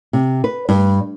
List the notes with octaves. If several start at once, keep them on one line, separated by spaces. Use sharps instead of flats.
C3
B4
G2